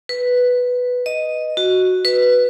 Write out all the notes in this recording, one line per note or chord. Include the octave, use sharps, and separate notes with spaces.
B4
D#5
F#4
B4